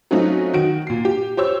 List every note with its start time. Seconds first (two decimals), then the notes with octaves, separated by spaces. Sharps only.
0.11 F#3 A3 C4 C#4 D#4 F4
0.53 D#3 F#4 D7
0.87 A#2 C7
1.05 G4
1.37 G4 C5 C#5 E6